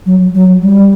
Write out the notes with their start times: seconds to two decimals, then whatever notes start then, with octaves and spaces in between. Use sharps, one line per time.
0.06 F#3
0.35 F#3
0.62 G3